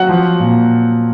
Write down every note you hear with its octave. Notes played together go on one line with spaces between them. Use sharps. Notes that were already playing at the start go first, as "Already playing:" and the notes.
Already playing: F#3 F#5
F3
A#2